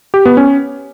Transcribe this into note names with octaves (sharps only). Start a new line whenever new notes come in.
G4
B3
C#4